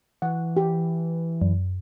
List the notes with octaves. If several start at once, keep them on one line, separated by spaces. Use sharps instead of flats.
E3 F#5
G4
F#2